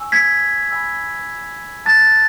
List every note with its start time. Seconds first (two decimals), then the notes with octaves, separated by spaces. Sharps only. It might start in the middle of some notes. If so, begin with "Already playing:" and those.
Already playing: G#5 C#6 E6
0.12 G#6 B6
0.71 G#5 B5 E6
1.86 A5 D#6 F#6 A6